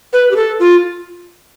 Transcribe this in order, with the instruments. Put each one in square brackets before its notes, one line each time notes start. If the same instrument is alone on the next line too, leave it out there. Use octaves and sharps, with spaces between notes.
[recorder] B4
G4
A4
F4